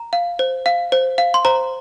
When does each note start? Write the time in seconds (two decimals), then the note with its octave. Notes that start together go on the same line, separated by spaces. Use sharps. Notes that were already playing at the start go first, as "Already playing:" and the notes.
Already playing: A#5
0.13 F5
0.39 C5
0.66 F5
0.92 C5
1.18 F5
1.34 C6
1.45 C5 A#5